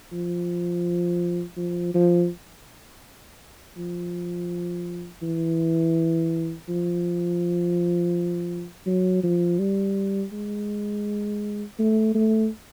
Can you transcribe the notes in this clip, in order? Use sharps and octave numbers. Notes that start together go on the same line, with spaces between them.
F3
F3
F3
F3
E3
F3
F#3
F3
G3
G#3
A3
A3